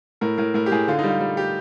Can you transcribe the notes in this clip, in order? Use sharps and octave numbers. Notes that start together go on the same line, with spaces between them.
A2 A#4
A2 A#4
A2 A#4
G4
A2 G#4
D3 F4
D#4
G3
F4
G3
G4